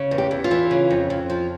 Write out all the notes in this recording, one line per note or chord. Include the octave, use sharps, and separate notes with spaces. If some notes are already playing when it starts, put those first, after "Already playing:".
Already playing: C#3
E2
G4
E2
F4
E3
C#3
F2
F2
F3